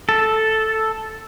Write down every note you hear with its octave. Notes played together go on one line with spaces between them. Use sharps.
A4